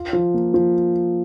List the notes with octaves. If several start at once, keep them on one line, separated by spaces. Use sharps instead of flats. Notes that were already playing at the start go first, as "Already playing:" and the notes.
Already playing: F4
F3
A#3
F3